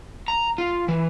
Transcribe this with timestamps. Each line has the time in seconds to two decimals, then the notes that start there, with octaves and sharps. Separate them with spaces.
0.28 A#5
0.58 F4
0.88 E3